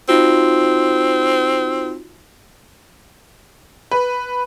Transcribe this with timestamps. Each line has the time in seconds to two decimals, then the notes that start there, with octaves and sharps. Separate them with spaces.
0.09 C4 D#4 F4 F#4
3.91 B4